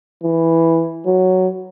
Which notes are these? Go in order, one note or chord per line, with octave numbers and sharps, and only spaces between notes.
E3
F#3